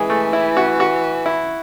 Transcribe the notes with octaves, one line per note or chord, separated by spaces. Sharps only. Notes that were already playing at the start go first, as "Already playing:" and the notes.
Already playing: E3 G#3
A3
E4
F#4
F#4
E4